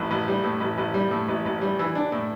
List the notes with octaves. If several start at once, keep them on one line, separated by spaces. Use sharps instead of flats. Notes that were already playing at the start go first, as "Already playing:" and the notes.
Already playing: A1 A2
A1
G3
A2
A1
A1
G3
A2
A1
A1
G3
E3
D4
A2